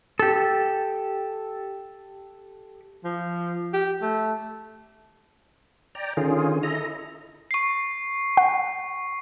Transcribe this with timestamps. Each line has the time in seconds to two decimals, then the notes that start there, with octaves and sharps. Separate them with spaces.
0.19 G4 A4
3.04 F3
3.74 G4
4.02 A3
5.95 D5 G5 A#5
6.17 D3 D#3 C#4 F4 G#4
6.63 E4 A4 D#5 A#5
7.51 C#6 C7
8.37 F#5